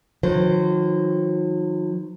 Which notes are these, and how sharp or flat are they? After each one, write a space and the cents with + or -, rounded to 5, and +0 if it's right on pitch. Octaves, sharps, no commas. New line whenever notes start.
D#3 +0 F#3 -45 C5 -30